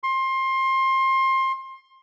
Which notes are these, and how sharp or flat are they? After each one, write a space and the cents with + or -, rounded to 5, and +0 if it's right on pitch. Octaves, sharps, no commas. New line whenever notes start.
C6 +25